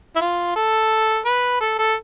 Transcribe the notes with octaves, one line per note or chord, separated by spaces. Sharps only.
E4
F4
A4
B4
A4
A4